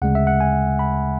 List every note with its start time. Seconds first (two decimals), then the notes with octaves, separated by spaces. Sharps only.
0.02 D2 C#3 G#3 F#5
0.15 E5
0.27 F#5
0.40 G#5
0.79 B5